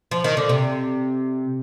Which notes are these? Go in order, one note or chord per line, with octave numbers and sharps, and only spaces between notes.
F3
D#3
D3
C3